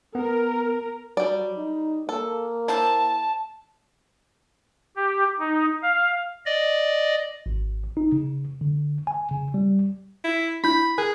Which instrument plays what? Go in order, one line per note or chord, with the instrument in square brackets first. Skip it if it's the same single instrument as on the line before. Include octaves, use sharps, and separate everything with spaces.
[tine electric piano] B3 [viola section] A#4
[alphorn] F#3 [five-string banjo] G3 D5
[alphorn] D#4
[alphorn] A#3 [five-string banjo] A4
[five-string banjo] E4 C5 [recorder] A5
[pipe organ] G4
D#4
F5
D5 D#5
[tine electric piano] G#1
D#4
C#3
D3
G#5
C#3
G3
[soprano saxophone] E4
[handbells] D4 E4 G6 [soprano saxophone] B5
[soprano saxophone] G#4 [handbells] A#4 G#5 F#6